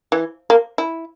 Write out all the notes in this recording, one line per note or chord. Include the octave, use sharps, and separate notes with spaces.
E3
A#3
E4